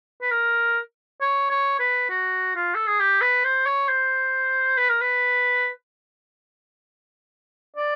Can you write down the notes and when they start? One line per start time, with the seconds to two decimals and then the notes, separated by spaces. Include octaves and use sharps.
0.22 B4
0.31 A#4
1.21 C#5
1.50 C#5
1.80 B4
2.09 F#4
2.55 F4
2.75 A4
2.87 G#4
3.00 G4
3.21 B4
3.44 C5
3.66 C#5
3.89 C5
4.77 B4
4.90 A#4
5.01 B4
7.76 D5